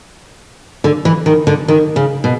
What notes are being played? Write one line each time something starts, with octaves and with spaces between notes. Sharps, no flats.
D3
E3
D#3
D3
D#3
C#3
B2